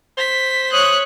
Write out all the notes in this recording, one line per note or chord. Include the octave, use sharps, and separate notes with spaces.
C5 B6
C#5 D#6 F#6